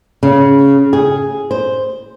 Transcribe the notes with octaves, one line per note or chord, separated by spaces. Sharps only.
C#3
G#4
C5